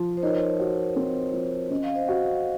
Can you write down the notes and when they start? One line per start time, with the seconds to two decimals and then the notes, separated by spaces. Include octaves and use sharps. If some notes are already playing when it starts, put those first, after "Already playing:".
Already playing: F3
0.17 C5
0.22 D#4 A#4 C#5
0.60 F#4
0.96 C4
1.33 F3
1.71 C#4 D#5
1.84 F5
1.95 C5 D#5
2.08 F#4